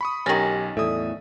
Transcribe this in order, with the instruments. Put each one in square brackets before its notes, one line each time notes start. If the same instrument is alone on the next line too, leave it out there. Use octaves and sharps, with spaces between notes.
[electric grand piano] B5 C#6 D#6
[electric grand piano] B1 G#5 A6 [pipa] D#3 C#4 [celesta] G4 A#6 F#7
[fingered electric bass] E2 A2 [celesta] A4 D5 [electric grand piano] E5 D#6